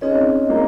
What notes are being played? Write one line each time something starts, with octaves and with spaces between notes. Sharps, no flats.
C4 C#4 D#4 G#4 D#5
A#3